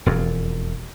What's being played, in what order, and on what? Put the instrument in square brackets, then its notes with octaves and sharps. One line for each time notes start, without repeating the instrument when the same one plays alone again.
[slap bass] E1 F2